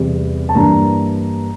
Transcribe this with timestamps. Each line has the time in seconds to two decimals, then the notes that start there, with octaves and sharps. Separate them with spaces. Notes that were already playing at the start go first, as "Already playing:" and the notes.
Already playing: E2 C3 G3
0.49 A5
0.55 G2 E3 A#3 D4 A#5